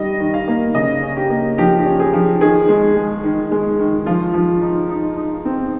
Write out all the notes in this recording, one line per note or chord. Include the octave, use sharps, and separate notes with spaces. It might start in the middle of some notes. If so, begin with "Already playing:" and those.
Already playing: D#3 G3 D#5
D#3
F5
A#3
C#3 D#5
C#4
G4
A#3
F3 G4
G4
C#4
G#4
F3
D#3 G#4
G#3
G#3
D#3
G#3
D#3
F3 F4
F3
D#4
D#4
D#4
C4